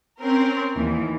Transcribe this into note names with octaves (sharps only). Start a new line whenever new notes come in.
C4 C#4 A#4
D#2 E3